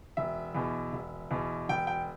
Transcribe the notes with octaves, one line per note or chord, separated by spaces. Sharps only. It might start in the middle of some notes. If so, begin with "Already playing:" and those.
E1 E5
E2 B2
E1
E2 B2
E1 G5
G5